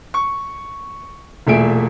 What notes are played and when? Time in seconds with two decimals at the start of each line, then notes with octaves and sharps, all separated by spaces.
0.14 C#6
1.47 E1 A#2 A3 G#4 E5 D7